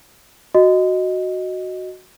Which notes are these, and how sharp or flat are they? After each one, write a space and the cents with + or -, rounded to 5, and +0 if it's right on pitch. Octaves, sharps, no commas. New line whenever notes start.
F#4 +0 D#5 +0